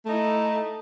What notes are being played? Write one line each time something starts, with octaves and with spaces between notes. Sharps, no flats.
A3 D#4 E4